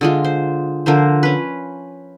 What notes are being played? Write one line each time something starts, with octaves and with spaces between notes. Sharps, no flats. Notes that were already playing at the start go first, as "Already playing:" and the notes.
D3 G#3 F4
C5
D3 F3 A#4 C5
C#4 B4